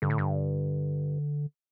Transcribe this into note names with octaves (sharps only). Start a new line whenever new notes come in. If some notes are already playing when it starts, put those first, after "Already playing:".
G2 D3
A2
G2